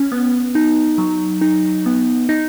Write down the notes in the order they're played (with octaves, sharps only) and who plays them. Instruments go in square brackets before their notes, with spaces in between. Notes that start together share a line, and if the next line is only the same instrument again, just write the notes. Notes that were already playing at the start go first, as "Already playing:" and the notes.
Already playing: [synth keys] C#4
B3
D#4
F#3
D#4
B3
D#4